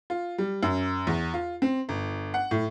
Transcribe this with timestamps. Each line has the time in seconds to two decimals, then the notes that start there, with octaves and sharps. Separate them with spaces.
0.10 F4
0.38 G3
0.63 F#2
1.07 E2
1.34 F4
1.62 C4
1.89 G1
2.34 F#5
2.51 A2